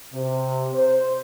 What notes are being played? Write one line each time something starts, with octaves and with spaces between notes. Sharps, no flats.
C3
C5